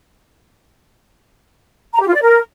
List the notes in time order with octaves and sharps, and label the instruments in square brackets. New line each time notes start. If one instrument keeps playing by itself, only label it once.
[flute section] A#5
G4
F4
D5
A#4